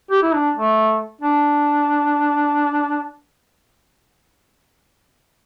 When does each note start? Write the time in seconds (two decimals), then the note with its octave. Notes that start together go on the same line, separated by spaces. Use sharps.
0.11 G4
0.22 E4
0.34 D4
0.56 A3
1.21 D4